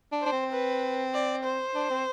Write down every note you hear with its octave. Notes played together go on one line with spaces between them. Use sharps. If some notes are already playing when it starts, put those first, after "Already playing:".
D4
D4 C5
C4
B4
D5
C5
D4
C4